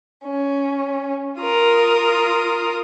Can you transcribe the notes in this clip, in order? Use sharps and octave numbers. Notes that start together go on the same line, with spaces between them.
C#4
F4 A#4 D#6